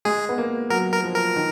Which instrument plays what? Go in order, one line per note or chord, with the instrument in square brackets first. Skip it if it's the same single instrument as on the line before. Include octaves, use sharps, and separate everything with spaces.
[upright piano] G#3 [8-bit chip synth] G#4
[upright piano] B3
A#3
[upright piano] F#3 [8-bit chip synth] A#4
[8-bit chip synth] A#4
[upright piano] F3
[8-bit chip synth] A#4
[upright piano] D#3